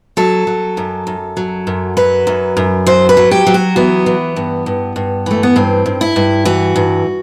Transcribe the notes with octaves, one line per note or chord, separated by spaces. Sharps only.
F#3 A4
F#3
F#2
F#2
F#3
F#2
F#3 B4
F#2
F#2
F#3 C5
B4
F#3
G4
F#3
F#4
E3 B3
E3
G2
G2
G2
E3 A3
B3
G2 C4
G2
E4
G2
E3 F#4
G2